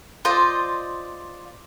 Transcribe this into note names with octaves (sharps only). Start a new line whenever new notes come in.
F4 C5 D5 D#5